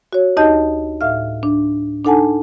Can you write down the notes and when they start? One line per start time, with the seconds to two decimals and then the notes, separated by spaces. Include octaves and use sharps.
0.13 F#4 C#5
0.37 D2 D#4 G4 D#5 A5 G6
1.01 A2 E5 F5 F6
1.43 D4
2.05 D4 D#4 A4 F#5 G#5 A5